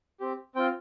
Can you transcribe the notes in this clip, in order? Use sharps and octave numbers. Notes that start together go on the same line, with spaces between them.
C4 G4
C4 F4 G5